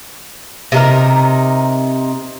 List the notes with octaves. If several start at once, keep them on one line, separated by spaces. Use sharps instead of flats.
C3 D#4 A#4